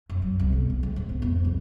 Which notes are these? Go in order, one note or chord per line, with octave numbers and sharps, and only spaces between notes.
F#2
F#3
C2
B1
D#2
C#2
G#2
B3
F2
C2